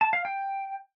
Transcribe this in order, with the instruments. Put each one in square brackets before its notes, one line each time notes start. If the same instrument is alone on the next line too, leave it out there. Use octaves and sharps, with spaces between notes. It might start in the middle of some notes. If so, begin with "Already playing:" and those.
[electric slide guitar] A5
F5
G5